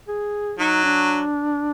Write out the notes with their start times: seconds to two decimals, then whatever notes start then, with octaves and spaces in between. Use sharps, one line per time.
0.08 G#4
0.59 F#3 D#4
0.85 D4